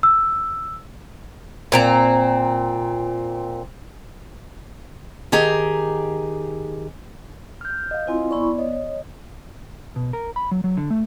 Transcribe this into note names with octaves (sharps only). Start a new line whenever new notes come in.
E6
A#2 C4 A#5
D#3 G4 G#4 A#5
F6 G6
D#5 F5
C4 E4 F4 C5 G#5 C6
B3 E4 D5 B5 C#6
C#5 D#5
B2
A#4
B5
F#3
F#3
D3
A3